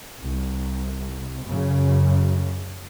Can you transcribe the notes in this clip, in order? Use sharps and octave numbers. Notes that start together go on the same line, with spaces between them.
C2
F#2 C#3